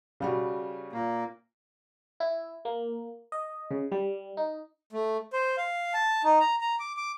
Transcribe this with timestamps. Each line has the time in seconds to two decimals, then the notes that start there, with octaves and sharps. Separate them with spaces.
0.20 C#3 G3 F#4
0.93 A#2 A#3
2.20 E4
2.65 A#3
3.32 D#5
3.71 C#3
3.92 G3
4.37 D#4
4.93 A3
5.33 C5
5.58 F5
5.94 A5
6.24 D#4
6.40 A#5
6.61 A#5
6.80 D6
6.97 D6